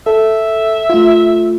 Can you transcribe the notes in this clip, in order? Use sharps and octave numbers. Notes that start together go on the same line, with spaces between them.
A4 E5
A3 F4